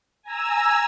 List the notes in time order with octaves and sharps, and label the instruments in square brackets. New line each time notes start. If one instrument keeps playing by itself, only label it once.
[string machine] G#5 A#5 E6